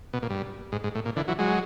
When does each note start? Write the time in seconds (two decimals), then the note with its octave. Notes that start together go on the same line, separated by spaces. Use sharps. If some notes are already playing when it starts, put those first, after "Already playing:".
0.13 B2
0.22 A#2
0.30 G2
0.72 G#2
0.84 G#2
0.95 A2
1.05 A#2
1.16 D3 E3
1.28 E3 F#3
1.39 F#3 G#3